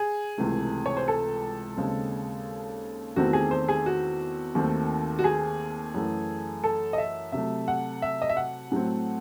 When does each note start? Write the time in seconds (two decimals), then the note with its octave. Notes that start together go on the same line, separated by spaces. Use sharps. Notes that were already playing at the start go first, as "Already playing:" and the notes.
Already playing: G#4
0.38 C#2 C3 E3 A3
0.86 C#5
0.97 C5
1.08 A4
1.77 D#2 C#3 G#3 C4
3.16 E2 D#3 A3 C4 F#4
3.33 G#4
3.51 C5
3.69 G#4
3.86 F#4
4.55 D#2 D#3 A3 C4
5.19 F#4
5.24 G#4
5.94 F#2 E3 A3
6.64 A4
6.93 D#5
6.98 E5
7.32 C3 F#3 A3 E5
7.68 F#5
8.02 E5
8.22 D#5
8.29 E5
8.37 F#5
8.72 A2 F#3 A3 C4